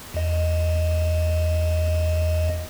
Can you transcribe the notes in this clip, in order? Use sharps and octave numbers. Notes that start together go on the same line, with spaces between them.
E2 D#5